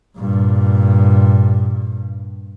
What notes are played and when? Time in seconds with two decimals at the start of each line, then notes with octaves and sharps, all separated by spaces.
0.17 G2 A#2